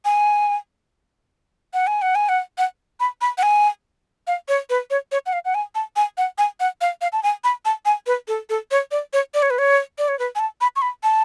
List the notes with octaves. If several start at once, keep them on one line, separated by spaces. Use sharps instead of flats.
G#5
F#5
G#5
F#5
G#5
F#5
F#5
B5
B5
F#5
G#5
F5
C#5
B4
C#5
C#5
F#5
F5
F#5
G#5
A5
G#5
F#5
G#5
F#5
F5
F5
A5
G#5
B5
A5
G#5
B4
A4
A4
C#5
D5
C#5
D5
C#5
B4
C#5
D5
C#5
B4
G#5
A5
B5
C#6
B5
A5